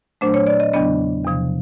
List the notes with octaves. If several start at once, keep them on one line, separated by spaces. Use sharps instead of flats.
A#2 F#3 A3 D4 C5
C#5
D5
D#5
E2 C#3 F#3 B3 D4 D#5
E2 C3 F3